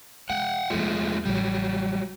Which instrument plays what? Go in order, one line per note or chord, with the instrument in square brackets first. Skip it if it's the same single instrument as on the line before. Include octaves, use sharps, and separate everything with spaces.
[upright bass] G#3 [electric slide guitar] F#5 G5
[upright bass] E2 G2 [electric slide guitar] F3 G#3 A3
[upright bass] A1 C#3 [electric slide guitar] F#3 G3